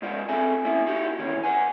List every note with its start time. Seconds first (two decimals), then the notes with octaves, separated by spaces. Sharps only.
0.02 G#2 G#3 F4 C5 D5
0.29 C4 G#4 A4 E5 G#5
0.65 A#3 C#4 E4 E5
0.86 D#4 E4 F#4 G4
1.19 E2 A#2 D#3 E3 C#4
1.43 B4 F#5 G#5